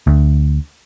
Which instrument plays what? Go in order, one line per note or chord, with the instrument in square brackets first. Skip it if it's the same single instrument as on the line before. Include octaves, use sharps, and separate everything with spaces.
[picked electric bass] D2